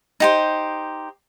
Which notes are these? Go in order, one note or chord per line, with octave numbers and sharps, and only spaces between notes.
D#4 G4 C5